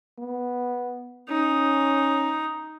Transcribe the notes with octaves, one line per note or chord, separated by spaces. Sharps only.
B3
C#4 D#4